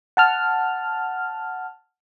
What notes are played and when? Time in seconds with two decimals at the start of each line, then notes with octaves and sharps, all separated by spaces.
0.17 F#5 A5 F6